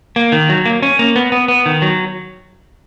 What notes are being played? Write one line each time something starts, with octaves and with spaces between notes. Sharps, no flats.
A#3
D#3
F#3
A#3
C#4
A#3
B3
B3
B3
D#3
F#3